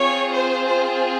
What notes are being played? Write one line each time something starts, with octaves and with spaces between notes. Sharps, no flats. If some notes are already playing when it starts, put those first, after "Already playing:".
Already playing: C4 F4 G#4 C#5
C5
C5